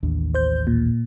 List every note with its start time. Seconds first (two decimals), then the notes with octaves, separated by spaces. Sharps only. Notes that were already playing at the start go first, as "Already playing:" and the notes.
0.03 A1 D#2 D4
0.34 C5 G6
0.67 A#2